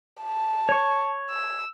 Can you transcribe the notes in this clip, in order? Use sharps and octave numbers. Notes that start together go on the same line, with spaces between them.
A5
C#5 C#6
E6